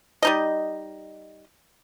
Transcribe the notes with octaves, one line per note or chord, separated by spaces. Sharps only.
G3 D#4 D#5